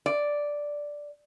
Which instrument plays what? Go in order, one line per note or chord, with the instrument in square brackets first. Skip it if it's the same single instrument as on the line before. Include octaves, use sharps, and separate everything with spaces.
[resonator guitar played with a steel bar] D5